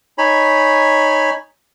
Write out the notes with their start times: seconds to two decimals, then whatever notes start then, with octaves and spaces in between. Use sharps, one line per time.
0.18 D#4 C#5 G#5 B5